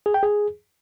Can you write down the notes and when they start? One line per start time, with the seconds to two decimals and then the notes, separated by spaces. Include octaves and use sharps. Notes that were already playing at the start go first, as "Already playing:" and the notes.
0.06 G#4
0.14 G5
0.23 G#4